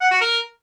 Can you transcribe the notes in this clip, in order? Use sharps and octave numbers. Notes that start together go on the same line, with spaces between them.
F#5
F#4
A#4